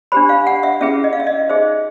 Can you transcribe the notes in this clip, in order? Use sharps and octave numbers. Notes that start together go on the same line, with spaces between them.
D4 G4 C5 B5
F5
F#5
E5
C#4 E4 G#4 B4 E5
D#5
F5
E5
D#5
D#4 G#4 C5 E5